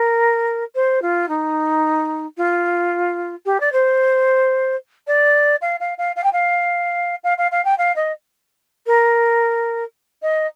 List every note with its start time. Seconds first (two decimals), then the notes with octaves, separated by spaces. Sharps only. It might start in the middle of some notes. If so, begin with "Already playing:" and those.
Already playing: A#4
0.75 C5
1.02 F4
1.29 D#4
2.37 F4
3.46 G4
3.60 D5
3.72 C5
5.07 D5
5.62 F5
5.80 F5
5.98 F5
6.16 F5
6.24 G5
6.33 F5
7.24 F5
7.38 F5
7.52 F5
7.65 G5
7.78 F5
7.96 D#5
8.86 A#4
10.22 D#5